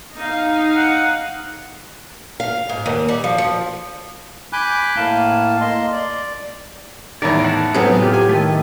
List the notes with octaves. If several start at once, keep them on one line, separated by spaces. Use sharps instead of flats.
D#4 F5
F#5
F5
G#2
D#2
G3
F3
F3
G#5 B5 D6 F#6 G6
A2 A#3 F5 A5
A#3 D#5 C6
D5
E2 A2 D#3 D5
F#5 A5
A2 C3 F#3 B3 G#4
F4 G4
G#5
D#3 A3 A4 D#5